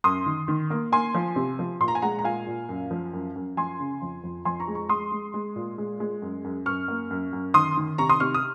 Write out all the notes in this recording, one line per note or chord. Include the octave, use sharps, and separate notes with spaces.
F#2 C6 D#6
D#3
D#3
A#3
A#3 G#5 C6
F3
C3
F3
A#2 C6
A#5
G#5
G#3 F#5 A#5
A#5
A#2 F5 G#5
A#2
F#2
F3
F#2
F#2
F3 G#5 C6
C#3
F2
F2
F2 G#5 C6
A#5 C#6
G#3
A#5 C#6
G#3 C6 D#6
G#3
G#3
A#2
G#3
G#3
F#2
F#2
F#2 C#6 F6
A#3
F#2
F#2
D#3 C6 D#6
D#3
C3 A#5 C#6
C6 D#6
C3 C#6 F6
D#6